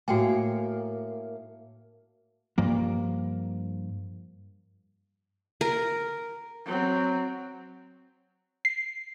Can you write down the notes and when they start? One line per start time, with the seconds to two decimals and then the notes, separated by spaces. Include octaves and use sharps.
0.08 A2 A#3 F#4 G5 G#5
2.58 G2 F3 A#3
5.61 A#4
6.65 F#3 C4
8.65 C7